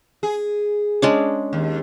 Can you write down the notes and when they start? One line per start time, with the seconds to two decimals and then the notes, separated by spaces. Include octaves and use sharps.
0.23 G#4
1.02 G#3 C#4 D4
1.53 D#2